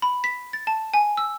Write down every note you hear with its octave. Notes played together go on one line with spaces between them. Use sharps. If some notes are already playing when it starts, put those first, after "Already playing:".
B5
B6
A6
A5
G#5
E6